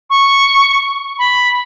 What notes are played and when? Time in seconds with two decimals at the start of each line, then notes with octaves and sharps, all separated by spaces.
0.10 C#6
1.19 B5